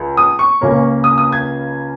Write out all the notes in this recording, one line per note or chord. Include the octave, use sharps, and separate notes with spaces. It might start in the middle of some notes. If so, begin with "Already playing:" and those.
Already playing: C#2
D#6
C#6
C#2 C#3 A#3 C#4
D#6
D#6
G#6